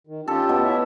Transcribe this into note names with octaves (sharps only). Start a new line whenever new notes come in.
D#3
C#4 F4 G4 A4
B2
E4 C#5 E5